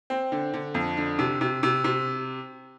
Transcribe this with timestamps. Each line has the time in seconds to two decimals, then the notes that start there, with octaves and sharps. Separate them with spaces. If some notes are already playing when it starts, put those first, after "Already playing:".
0.10 C4
0.32 D3
0.54 D3
0.74 F2
0.97 D3
1.19 C3
1.41 C3
1.63 C3
1.84 C3